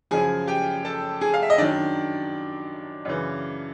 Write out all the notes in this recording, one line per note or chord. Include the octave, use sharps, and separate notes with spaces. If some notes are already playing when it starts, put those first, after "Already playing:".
F#2 C#3 F3 G#4 G#5
G4 G5
A4 A5
G#4 G#5
F5
E5
D#5
F#2 D#3 F#3 D4 D5
F#2 C#3 E3